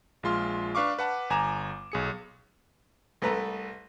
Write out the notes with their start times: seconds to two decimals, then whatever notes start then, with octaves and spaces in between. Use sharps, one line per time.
0.23 A#1 G#3 F4 C6 F6
0.75 D4 B4 F5 C#6 D6
0.98 B4 F#5 A5
1.30 G1 G#5 A#5 D6 E7
1.92 B1 G#4 C#7
3.22 C2 A3 B4 A#5